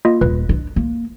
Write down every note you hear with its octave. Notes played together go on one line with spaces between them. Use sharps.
A#3 F4 D#5
D#1 B4
D4
A#3